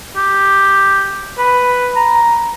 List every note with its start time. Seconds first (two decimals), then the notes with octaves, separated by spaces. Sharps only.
0.16 G4
1.38 B4
1.96 A#5